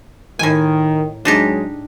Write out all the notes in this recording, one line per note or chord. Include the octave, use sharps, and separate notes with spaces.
A2 D#3 G#5
F#3 G#3 D4 D#4 G4